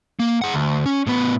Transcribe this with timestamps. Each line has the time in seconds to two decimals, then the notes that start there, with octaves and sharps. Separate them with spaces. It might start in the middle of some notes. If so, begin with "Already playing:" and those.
0.19 A#3
0.42 G#4 F#5
0.53 D2
0.86 C#4
1.07 A2 B3